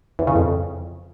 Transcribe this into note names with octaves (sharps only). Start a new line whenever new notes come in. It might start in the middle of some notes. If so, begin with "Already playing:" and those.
E2
C#3
F2